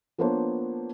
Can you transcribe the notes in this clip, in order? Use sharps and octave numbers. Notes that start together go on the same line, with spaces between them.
F3 A#3 B3 D4 C5 C#5